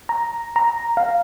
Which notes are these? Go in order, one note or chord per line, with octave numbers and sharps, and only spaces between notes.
A#5
A#5
F5